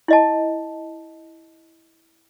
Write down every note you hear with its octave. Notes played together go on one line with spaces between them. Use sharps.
E4 D#5 A5